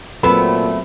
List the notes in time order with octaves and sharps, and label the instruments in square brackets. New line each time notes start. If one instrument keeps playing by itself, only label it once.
[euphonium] A#2 [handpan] F#3 C4 [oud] A3 B3 [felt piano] B5